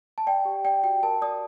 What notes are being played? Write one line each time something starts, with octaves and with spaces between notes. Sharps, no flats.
A5
D5 G5
G4
D5 G5
F#4 G5
A#4 A5
D5 D#6